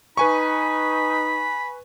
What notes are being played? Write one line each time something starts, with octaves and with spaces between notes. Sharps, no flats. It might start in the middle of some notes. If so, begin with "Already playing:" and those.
D#4 B4 G#5 B5 C#6